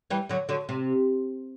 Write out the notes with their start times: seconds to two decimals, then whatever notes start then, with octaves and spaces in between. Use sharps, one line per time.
0.10 E3 G3
0.29 D3 F#3
0.49 D3 F#3
0.69 C3